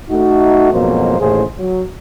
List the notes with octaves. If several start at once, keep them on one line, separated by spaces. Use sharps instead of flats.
A3 D#4 F#4
F2 G#2 B2 F#3 A#3 C5
A1 D#2 A2 C#3 G#4 C5
F#3